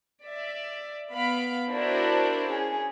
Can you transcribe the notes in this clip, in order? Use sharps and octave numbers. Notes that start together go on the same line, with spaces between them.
D5 E5
B3 F5 B5 D7
D4 E4 F#4 A#4 C5 D5
C#4 G#4